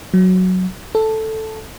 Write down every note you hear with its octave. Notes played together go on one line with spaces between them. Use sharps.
F#3
A4